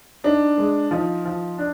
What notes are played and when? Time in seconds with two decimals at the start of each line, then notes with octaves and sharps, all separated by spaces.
0.24 D4 D#4
0.58 G#3
0.91 F3 D#4
1.25 F3
1.58 D4